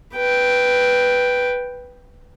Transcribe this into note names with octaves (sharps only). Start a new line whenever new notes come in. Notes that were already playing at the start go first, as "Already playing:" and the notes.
B4 G5